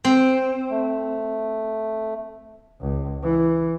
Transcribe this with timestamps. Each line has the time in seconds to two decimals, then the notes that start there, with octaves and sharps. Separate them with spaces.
0.05 C4
0.70 A3
2.81 C#2
3.23 E3